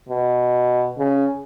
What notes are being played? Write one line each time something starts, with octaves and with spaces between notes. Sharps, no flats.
B2
C#3